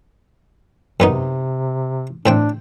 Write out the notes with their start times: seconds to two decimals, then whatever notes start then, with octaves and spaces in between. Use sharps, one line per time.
1.00 F#2 C3 B3 D#4
2.26 A2 C4 D4 G5